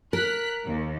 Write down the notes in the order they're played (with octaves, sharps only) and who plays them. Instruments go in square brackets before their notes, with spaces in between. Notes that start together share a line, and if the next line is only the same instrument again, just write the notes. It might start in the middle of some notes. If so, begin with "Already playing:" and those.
[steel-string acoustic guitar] A#4 [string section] F#6 B6
[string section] D#2